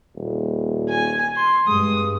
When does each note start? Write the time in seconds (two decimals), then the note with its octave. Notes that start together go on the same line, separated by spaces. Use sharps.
0.16 D#1
0.89 G#5
1.36 C6
1.67 G2 G#3 D#6